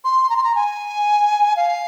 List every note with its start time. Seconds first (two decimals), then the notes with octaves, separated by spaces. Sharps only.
0.04 C6
0.30 A#5
0.37 C6
0.44 A#5
0.55 G#5
1.56 F5